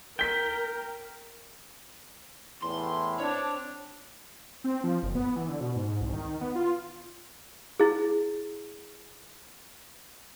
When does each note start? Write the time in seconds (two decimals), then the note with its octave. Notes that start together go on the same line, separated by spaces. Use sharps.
0.19 A#4 G5 B6 G7
2.63 E2 A2 C6
3.20 C4 D4 C#5
4.64 C4
4.84 F3
5.03 F#1
5.15 B3
5.36 E3
5.49 D3
5.61 B2
5.76 G#2
6.01 C2
6.13 D#3
6.41 B3
6.55 F4
7.80 E4 G#4